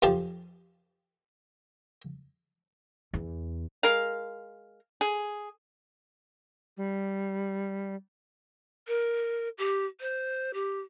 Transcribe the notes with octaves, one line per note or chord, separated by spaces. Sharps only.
F2 F3 G4 A5
E2
G#3 A#4 F5
G#4
G3
A#4
G4
C5
G4